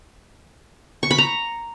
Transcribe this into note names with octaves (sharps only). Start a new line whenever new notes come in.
C#6
B5
A#5